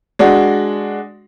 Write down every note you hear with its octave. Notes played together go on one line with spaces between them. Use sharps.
G#3 D4 F#4